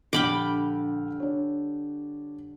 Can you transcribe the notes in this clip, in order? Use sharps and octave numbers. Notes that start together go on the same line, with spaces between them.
A#1 D3 G3 G5 B5 D6 F6
D4 C#5